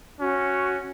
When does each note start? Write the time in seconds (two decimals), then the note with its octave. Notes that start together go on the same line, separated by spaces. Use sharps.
0.20 C#4 F#4